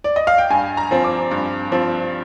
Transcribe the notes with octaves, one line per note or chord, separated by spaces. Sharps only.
D5
D#5
F5
G5
G2 G#5
A#5
F3 C4
D6
G2
F3 C4